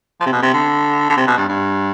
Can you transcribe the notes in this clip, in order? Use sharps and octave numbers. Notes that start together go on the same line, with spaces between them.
F3
C3
B2
C3
D3
D3
C3
B2
G2
G2